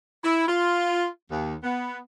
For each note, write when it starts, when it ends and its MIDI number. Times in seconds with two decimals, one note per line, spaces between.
0.24 0.46 64
0.47 1.06 65
1.31 1.54 39
1.63 1.98 59